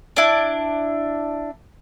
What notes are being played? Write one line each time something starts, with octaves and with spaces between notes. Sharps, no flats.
D4 E4